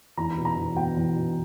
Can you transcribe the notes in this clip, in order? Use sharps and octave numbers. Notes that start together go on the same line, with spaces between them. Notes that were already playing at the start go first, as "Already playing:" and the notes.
E2 A#5
B5
B2
A#5
E2
B2 G5
E2
B2